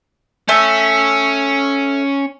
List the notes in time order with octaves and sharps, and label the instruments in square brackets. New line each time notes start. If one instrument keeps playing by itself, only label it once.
[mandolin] A3 E5 [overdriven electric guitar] C#4